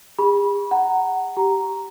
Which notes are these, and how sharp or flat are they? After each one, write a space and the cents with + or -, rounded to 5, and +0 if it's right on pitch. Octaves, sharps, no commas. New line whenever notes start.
G#4 -45 B5 -25
F#5 +15 A#5 -15
G4 -5 A#5 +0